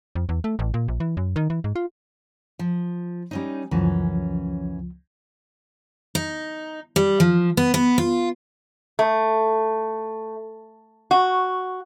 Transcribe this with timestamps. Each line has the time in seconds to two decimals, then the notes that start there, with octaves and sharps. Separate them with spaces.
0.15 F2
0.29 E2
0.44 A3
0.59 A1
0.74 A#2
0.88 A#1
1.00 E3
1.17 F#2
1.36 D#3
1.50 E3
1.64 G#2
1.76 F4
2.59 F3
3.31 G3 C#4 D#4
3.71 C#2 F#2 E3 F3 C#4
6.15 D#4
6.96 G3
7.20 F3
7.57 B3
7.74 B3
7.98 F4
8.99 A3
11.11 F#4